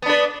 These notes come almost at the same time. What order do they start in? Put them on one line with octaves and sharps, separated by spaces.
B3 D4 B4